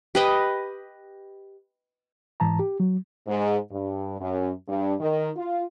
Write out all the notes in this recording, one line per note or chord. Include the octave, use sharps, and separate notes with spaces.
G4 B4 D#5
G#2 E3 A5 A#5
G4
F#3
G#2
G2
F#2
G2
D#3
F4